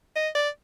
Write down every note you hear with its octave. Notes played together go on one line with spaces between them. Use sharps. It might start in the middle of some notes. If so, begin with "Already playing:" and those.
D#5
D5